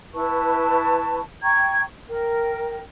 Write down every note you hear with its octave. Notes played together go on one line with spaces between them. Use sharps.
E4 B4 A5 C#6
G5 A#5 C#6 G#6
A#4 G5